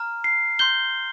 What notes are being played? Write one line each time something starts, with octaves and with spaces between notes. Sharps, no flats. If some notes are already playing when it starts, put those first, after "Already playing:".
Already playing: A#5 F6
C7
C6 G6 G7